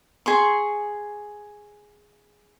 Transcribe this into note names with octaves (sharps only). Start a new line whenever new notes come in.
G#4 C6 C#6